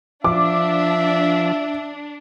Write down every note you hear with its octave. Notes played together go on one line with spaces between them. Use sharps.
F3 D4 E5 D6